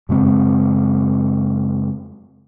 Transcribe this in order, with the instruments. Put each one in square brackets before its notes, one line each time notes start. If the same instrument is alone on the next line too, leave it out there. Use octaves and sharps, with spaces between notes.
[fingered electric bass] F#2 C#3 G#3 C4